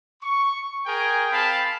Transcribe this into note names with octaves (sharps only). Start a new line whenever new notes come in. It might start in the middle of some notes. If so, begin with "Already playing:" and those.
C#6
G#4 A#4 G5 G#5
C4 F5 G5 A5 B5